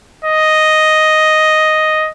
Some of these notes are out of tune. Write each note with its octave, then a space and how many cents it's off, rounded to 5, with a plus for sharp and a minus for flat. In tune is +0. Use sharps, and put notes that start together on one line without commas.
D#5 +0